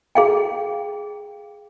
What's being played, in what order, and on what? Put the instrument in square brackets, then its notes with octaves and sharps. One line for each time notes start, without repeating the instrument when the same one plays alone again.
[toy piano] G#4 F5 G5